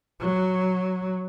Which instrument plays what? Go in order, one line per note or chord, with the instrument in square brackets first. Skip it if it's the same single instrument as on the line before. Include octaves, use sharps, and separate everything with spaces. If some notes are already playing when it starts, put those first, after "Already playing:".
[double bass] F#3